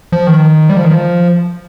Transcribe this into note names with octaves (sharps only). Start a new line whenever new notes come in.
F3
D#3
G3
F3
D#3
F3